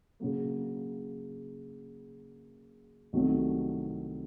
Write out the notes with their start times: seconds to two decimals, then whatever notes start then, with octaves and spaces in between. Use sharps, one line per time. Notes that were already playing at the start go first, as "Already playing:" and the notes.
0.20 C#3 F#3 A#3
3.13 C2 C3 D#3 F#3 A3